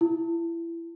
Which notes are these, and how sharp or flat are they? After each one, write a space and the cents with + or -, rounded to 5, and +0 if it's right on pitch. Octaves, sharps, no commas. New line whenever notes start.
E4 +25